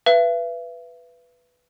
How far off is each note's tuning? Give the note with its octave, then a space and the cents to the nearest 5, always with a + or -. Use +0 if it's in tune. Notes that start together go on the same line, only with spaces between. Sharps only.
B4 +0 E5 +40